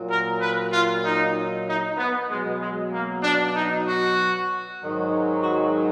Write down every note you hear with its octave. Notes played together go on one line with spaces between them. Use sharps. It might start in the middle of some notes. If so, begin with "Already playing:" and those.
Already playing: A#2 F#3
A#4
B4
F4
D#4
D#4
B3
B2 F#3 G#3
G#3
A#3
D4
D#4
F#4
G#2 D#3 F#3
F#4